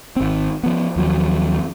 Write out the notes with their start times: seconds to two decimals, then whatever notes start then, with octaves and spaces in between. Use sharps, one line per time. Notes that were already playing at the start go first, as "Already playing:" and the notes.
0.16 G#1 C4
0.63 F3 B3
0.96 D#2 F3 F#3